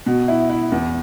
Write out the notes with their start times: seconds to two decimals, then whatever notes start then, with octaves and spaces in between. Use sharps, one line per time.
0.06 B2
0.28 E4
0.50 E4
0.72 E2